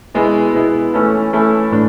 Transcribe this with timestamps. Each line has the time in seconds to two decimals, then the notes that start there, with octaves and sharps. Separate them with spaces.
0.14 B2 G#3 B3 E4
0.54 B2 G#3 B3 E4
0.94 E3 A3 C#4 E4 A4
1.33 E3 A3 C#4 E4 A4
1.72 A2 E3 A3 D4